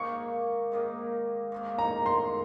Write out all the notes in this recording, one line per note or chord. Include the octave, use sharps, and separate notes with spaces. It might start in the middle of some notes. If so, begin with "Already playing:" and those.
Already playing: G#2 D#3 A#3 C#6
G#2 D#3 A#3
G#2 D#3 A#3
A#5
C6